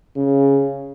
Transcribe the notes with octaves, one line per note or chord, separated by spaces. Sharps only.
C#3